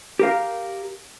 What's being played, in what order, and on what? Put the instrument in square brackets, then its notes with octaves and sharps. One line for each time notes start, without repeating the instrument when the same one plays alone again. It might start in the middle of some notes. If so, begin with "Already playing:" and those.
[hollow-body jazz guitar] G4 A#4 F5